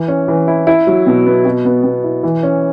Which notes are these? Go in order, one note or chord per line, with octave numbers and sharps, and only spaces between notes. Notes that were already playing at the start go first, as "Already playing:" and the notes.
Already playing: E3
C#4
E3
E4
E4
F#3
B2
B3
B2
B3
B2
E4
E3
C#4